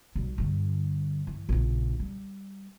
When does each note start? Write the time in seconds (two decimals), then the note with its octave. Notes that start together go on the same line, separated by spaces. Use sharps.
0.15 B1 G3
0.38 G2 D3
1.27 E3
1.49 A#1 C#3
1.99 G3